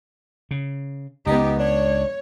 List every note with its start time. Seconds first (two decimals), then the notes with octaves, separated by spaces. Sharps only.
0.51 C#3
1.26 C#2 B3 D#4 G4
1.59 D4 C#5